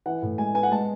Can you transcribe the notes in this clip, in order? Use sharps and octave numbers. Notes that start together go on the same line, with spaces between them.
E3 F#5
A2
G#3 G#5
B3 G#5
F#5
G#3 A5